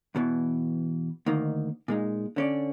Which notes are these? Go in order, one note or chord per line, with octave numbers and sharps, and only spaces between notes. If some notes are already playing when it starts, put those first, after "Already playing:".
E2 B2 D#3 E3
D2 D#3 A#3 D#4
A#2 G#3 D#4
D3 C#4 D5